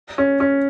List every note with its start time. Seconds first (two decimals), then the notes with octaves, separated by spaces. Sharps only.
0.18 C#4
0.40 C#4